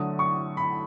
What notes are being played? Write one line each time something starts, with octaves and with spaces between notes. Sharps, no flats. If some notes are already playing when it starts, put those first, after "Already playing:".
Already playing: D3 F#3 A3 D#6
C#6
B5